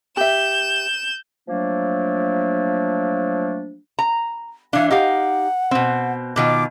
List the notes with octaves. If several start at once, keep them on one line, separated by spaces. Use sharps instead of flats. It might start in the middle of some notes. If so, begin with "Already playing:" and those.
G4 E5 G6 E7
F3 F#3 A3 A#3 D4
A#5
E3 D4 F5
D#4 G4 F5 F#5
B2 C4
B2 D#3 F4 D6